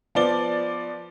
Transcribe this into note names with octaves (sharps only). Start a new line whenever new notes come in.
F3 B3 D5 G7